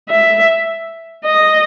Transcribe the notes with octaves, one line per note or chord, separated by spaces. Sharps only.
E5
D#5